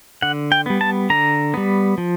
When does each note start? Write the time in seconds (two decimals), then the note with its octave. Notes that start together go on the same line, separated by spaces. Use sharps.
0.22 D3 F#5
0.52 G5
0.66 G3 B3
0.81 A5
1.10 D3 A#5
1.54 G3 B3
1.98 F3